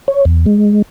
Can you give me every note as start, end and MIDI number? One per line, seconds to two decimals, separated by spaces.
0.08 0.25 73
0.25 0.46 40
0.46 0.82 56